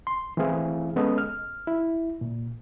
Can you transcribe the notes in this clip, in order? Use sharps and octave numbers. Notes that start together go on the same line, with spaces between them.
C6
E3 A3 C4 E4 G#4 F5
G#3 B3 C#4 A4 D#5
F6
E4
A#2